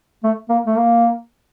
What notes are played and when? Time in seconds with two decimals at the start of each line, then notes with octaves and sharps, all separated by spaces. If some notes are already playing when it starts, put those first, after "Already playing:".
0.24 A3
0.50 A#3
0.66 A3
0.76 A#3